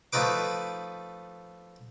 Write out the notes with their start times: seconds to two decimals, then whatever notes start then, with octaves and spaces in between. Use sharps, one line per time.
0.13 F3 A3 D#4 B4 D6